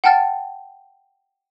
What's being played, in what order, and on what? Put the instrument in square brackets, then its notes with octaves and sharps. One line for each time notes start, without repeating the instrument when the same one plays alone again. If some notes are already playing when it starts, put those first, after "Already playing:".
[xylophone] F#5 G5 A5 F6 A6